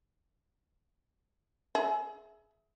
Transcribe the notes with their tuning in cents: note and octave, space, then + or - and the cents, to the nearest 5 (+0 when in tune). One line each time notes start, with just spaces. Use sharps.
G#4 +25 E5 +0